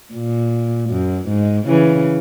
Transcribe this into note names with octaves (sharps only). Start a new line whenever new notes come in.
A#2
F#2
G#2
C#3 E3